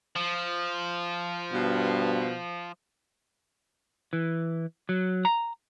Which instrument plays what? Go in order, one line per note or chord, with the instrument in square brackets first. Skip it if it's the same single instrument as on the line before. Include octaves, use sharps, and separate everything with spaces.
[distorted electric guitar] F3
[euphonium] G2 [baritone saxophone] B2
[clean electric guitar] E3
F#3
A#5